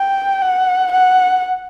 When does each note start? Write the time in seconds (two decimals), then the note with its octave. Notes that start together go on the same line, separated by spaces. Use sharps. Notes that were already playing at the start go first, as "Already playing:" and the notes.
Already playing: G5
0.42 F#5
0.92 F#5